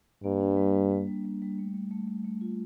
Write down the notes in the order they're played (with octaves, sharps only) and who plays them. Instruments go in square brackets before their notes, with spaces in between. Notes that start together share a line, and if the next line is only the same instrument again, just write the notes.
[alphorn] G2 [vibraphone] A#3
[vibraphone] D4
G3
G3
G3
G3
G3
G3
A3
A3
A3
A3
A3
F4